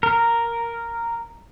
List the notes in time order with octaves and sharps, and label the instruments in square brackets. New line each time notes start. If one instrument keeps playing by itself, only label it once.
[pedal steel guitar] A#4